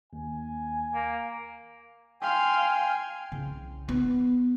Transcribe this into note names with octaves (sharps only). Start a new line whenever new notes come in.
D#2 G#5
A#3
F5 G5 G#5 C6
C2 C#3
B3